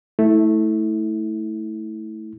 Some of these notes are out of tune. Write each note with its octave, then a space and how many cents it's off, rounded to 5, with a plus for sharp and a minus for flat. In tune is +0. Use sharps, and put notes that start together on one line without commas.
A3 +0 E4 -25